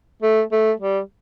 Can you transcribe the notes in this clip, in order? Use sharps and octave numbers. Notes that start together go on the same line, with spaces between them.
A3
A3
G3